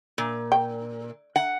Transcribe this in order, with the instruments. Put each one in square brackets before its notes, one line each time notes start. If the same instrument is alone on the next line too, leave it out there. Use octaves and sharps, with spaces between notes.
[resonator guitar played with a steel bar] A#2
[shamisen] G5
[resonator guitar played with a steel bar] F#5